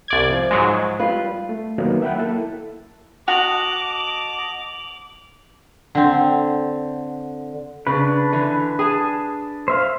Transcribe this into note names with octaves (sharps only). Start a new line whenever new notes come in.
C2 D5 G#6
F3
G#2 F#3 G#3
G3 F4 B4
A3
D#3 F#3 A#3 B3 D#4
E5 F#5 G5 B5 F#6
A#3 E4 A4
F#4 D#5 A5 D6 F7 F#7
D3 C4
C#3 D4 B4
D3 E3
G#4 G#5 A5
C5 E5 F5